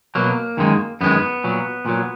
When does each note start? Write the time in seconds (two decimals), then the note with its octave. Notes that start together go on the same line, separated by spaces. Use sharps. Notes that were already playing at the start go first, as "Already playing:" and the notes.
0.15 B2 F#3 A#3
0.57 F#2 D#3 G#3
1.01 F#2 D#3 G#3 B3
1.44 A#2 F#3
1.86 A#2 F#3